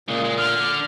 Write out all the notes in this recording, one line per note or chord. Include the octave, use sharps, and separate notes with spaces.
A#2 C#3 G#3
G#3
D3 F6
D3